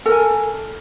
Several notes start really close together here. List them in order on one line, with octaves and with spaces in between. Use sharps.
A4 A#4 G#5